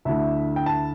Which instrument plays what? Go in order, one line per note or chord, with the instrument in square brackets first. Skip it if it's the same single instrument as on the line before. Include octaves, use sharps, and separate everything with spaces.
[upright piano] D2 D3 A3 E4 E5
G5
A5